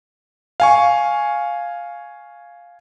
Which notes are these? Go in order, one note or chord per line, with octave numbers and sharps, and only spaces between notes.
F5 G#5 C#6